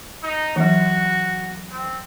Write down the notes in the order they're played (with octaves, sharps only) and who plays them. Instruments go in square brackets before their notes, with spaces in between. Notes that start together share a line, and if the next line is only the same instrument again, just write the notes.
[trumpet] D#4
[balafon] E3 F#3 [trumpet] F#4
[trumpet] C4